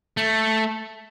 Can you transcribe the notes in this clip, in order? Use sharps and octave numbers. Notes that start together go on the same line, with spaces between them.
A3